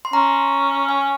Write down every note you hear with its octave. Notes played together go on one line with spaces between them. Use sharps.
C6
C#4 A#5
G#5